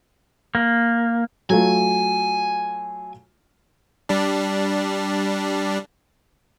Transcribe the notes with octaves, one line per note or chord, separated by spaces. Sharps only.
A#3
F#3 A3 F4 G#5
G3 D4